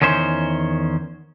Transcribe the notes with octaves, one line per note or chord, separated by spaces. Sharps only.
E2 D#3 C#4 C5